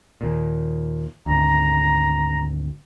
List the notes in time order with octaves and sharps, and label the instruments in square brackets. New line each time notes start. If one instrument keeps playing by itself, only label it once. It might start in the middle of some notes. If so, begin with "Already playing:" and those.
[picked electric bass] D#2 A#2
[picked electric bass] G#1 D2 [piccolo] A#5